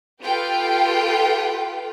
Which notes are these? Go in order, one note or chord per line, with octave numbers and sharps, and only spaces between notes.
F4 G4 A4 B4 G5